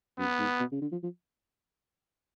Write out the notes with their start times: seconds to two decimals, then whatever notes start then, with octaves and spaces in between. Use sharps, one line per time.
0.18 F#2 B3
0.39 G#2
0.60 B2
0.72 C#3
0.81 D3
0.92 F3
1.03 F3